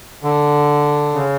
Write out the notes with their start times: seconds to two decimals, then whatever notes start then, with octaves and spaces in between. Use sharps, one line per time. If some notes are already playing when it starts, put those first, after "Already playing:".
0.23 D3
1.14 C#3